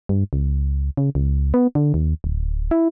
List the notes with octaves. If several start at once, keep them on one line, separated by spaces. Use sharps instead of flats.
G2
C#2
C#3
C#2
B3
D3
D#2
D1
E4